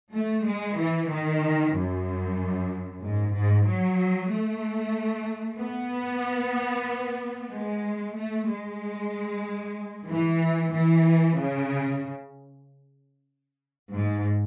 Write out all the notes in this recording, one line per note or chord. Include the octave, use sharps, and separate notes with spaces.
A3
G#3
E3
D#3
F#2
G#2
G#2
F#3
A3
B3
G#3
A3
G#3
E3
E3
C#3
G#2